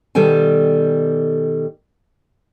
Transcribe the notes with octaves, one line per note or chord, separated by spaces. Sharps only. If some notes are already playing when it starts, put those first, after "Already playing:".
B2 D#3 G3 A4 G5 G#5